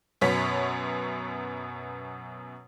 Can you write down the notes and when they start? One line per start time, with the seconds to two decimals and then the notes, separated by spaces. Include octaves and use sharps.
0.21 F#2 B2 B3 C#5 B6